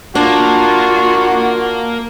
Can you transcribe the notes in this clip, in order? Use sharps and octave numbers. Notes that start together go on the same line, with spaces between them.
A#3 D4 F4 F#4